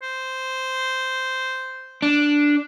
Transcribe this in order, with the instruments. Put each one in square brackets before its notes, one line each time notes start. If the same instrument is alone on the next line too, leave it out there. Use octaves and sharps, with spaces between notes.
[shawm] C5
[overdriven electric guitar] D4